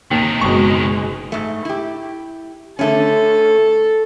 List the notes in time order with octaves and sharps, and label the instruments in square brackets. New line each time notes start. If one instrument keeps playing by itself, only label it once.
[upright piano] D#2 [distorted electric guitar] C3 D#3
[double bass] F#1 [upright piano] B2 C#6 [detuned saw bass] G#3
[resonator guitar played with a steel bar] G#2 A3
E4 G4
[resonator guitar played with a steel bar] D3 A3 C#4 [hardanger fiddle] A4